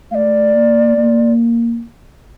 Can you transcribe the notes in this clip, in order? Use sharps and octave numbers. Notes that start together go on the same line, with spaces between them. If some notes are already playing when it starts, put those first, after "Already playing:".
A3 D5 F5
A#3
A#3